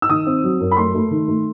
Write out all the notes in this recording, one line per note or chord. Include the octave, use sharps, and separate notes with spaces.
E6
D#3 D#6
C4
F#3
F#2
B5
A3 C6
A3
D#3
A3